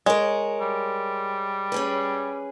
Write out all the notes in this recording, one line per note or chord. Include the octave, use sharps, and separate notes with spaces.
G#3 A#4 C#5
G3
C#4 G#4 B4